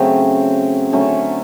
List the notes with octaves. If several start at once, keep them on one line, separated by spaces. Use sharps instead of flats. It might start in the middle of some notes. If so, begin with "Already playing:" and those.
Already playing: C#3 F#3 A3 C4
D3 F#3 A3 C#4